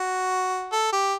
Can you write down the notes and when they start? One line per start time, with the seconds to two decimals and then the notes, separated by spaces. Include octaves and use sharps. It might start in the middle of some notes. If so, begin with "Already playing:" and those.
Already playing: F#4
0.72 A4
0.92 G4